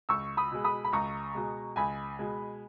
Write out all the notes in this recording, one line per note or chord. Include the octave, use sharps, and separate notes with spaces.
C#2 C#6 E6
B5 D#6
B2 G#3
B5 D#6
B5
C#2 A#5 C#6
B2 G#3
C#2 G#5 B5
B2 G#3